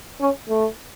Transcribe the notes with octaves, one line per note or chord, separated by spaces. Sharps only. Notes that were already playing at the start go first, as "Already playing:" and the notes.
C#4
A3